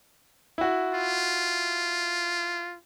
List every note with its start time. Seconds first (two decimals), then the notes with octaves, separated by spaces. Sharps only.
0.58 E4 F#4
0.94 F4